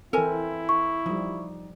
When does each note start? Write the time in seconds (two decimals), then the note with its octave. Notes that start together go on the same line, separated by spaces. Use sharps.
0.13 E3 C4 E4 A4 A#4 G#5
0.69 C#6
1.06 F3 G3 D#4